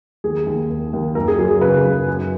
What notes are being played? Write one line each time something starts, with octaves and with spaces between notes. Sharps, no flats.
D#2 G#4
D#2
D#2
D#2
F#2 A#4
G#4
F#3 G#4
G#4
C#3 B4
F#2
F#2